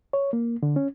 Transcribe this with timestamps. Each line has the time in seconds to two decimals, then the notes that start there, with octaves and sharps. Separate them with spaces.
0.13 C#5
0.33 A#3
0.63 D3
0.76 C#4